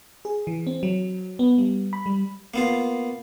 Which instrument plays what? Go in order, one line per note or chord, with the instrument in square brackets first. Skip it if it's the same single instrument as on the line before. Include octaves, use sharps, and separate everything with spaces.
[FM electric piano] G#4
E3
C4
F#3
B3
G3
B5
G3
[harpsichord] A#3 B3 F4